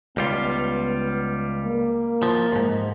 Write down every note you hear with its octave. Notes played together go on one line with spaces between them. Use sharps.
C#2 G3 B3 F4
A#3
F3
D#2 G#2